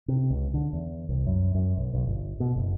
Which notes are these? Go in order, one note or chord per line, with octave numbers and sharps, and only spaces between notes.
C3
C#2
D3
E2
C2
F#2
F#2
B1
B1
G1
B2
F#1